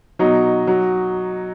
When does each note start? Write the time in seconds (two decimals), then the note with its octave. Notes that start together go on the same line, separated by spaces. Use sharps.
0.19 B2 F#3 D#4
0.67 F#3